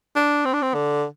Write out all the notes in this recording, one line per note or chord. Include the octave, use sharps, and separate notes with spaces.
D4
C4
D4
C4
D3